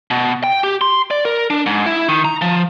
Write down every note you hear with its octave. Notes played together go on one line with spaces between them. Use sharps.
B2
G5
G4
C6
D5
A#4
D4
G#2
E4
D#3
A#5
F3